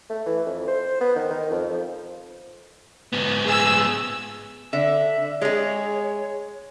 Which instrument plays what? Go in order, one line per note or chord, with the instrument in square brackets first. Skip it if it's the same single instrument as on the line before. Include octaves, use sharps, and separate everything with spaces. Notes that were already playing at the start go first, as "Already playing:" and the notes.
[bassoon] A3
E3
F2
C5
B3
D#3
D#3
F2
F3
[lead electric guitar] G#2 B3
[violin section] G#4 E6
[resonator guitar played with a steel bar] D3 [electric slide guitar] E5
[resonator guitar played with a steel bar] G#3 G#4 [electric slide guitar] C#5